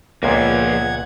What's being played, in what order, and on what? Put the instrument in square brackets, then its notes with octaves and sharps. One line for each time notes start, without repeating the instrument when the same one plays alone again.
[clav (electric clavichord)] C#2 A#2 B3 [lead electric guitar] F3 A#3 [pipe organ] F#5 G#6